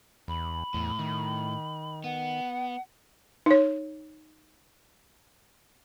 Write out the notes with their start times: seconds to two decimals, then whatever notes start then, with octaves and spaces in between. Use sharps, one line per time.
0.28 E2 B5
0.74 E2 A2
0.99 D#3
2.04 B3 F#5
3.46 D#4 C#5